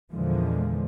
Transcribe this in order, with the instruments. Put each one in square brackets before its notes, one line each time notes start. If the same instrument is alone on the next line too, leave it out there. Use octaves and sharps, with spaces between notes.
[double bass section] E2 A#2 D3 E3 F3 G#3